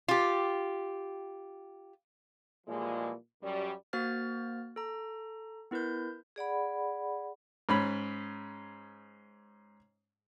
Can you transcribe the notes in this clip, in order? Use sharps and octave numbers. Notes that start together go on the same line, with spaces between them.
F4 G4
A#2 E3 F3 G3 G#3
F#2 G3
A#3 F#4 C5 F6 A6
A4 A#5
B3 E4 A#4 B4 G6
G#4 D5 F#5 B5
G#2 C#4 B5